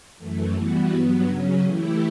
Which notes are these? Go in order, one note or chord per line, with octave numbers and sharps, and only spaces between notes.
F#2 E3 A3
E3 G3 B3 F#4
G2 F#3 B3
C#3 F#3 C#4
E3 A3 E4 G4